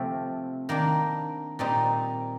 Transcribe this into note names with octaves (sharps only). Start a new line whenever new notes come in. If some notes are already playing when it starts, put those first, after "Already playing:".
Already playing: C3 F3 A3 C4
D#3 A#3 D4
A#2 G3 C4 D#4